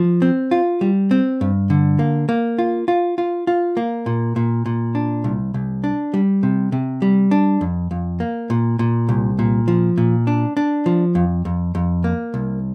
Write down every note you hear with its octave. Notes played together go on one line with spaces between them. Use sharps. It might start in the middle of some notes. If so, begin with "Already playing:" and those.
Already playing: F3
C4
F4
G3
C4
G2
D3
A#3
A#3
F4
F4
F4
F4
A#3
A#2
A#2
A#2
D4
C2
C2
D4
G3
C3
C3
G3
D4
F2
F2
A#3
A#2
A#2
C2
A#2
F3
A#2
D4
D4
F3
F2
F2
F2
A#3
C2